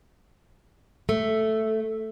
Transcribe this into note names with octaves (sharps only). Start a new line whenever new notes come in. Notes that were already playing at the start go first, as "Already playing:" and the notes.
A3